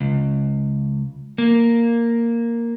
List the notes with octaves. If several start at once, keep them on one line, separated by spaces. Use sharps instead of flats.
C#2
A#3